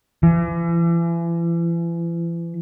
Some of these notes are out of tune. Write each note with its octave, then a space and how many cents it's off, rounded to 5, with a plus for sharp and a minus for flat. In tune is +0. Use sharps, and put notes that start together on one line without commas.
E3 +40